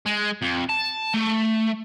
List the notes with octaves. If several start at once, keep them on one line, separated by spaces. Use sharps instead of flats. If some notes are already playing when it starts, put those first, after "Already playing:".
G#3
F2
A5
A3